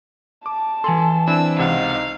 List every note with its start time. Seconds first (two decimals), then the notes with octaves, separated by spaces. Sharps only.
0.46 A5 D6
0.84 E3 A4 G#5 C6
1.28 C4 D4 E4 E6
1.58 C#2 C3 D#4 F5 F#5